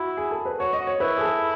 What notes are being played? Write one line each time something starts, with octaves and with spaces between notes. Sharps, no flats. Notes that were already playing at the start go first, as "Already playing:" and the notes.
Already playing: E4 F#4
G#4
A4
B4
F#4 C#5
D#5
F#4
C#5
E4 B4
G#4
A4